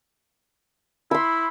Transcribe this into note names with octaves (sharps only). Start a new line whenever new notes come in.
E4 B5 C6